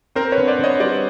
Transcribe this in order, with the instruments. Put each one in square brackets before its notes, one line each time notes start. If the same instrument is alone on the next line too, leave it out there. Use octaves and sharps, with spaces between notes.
[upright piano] C4 [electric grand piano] A#4 C5
[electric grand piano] B4 C#5
[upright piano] D3
[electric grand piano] C5 D5
[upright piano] D3
[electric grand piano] C#5 D#5
[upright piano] G3 [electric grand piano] C5 D5